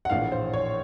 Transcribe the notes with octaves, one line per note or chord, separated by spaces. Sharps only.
F#5
A#1 A2 E3 F5
C5
C#5